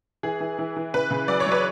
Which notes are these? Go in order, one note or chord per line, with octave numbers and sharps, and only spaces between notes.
E3 G#4
E3
E3
E3
C#3 B4
C#3
F#3 D5
C#5
F#3
B4